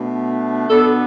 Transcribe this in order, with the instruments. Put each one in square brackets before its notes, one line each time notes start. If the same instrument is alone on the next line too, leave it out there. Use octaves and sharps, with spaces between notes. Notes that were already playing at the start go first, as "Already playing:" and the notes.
Already playing: [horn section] B2 A3 D4
B2 B3 D4 A4